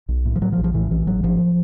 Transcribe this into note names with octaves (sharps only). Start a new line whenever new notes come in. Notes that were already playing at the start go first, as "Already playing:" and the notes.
B1
A2
F3
A2 F#3
F3
A#1
F3
A2 E3
A#1 E3
G#1 F#3
G#1 F3